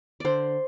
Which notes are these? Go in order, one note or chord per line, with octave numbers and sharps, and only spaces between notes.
D3 C5 D5